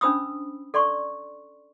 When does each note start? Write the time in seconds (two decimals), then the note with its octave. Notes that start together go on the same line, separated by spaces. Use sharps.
0.01 C#4 D4 C5 B5 D#6 E6
0.74 A4 D5 C6 C#6